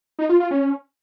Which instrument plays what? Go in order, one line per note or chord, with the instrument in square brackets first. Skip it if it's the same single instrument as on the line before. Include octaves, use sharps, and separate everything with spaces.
[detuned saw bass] D#4
F4
F4
C#4